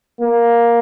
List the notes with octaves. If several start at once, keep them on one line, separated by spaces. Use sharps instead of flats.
A#3